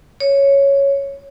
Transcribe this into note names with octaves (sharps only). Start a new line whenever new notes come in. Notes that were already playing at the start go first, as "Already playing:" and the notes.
C#5